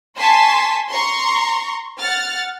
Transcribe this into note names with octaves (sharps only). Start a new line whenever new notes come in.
G#5 A5 C6 C#6 B6
A#5 C6 C#6
F#5 F6 A6